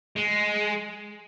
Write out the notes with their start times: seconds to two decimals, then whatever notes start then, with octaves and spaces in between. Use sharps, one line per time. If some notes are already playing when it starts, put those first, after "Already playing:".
0.17 G#3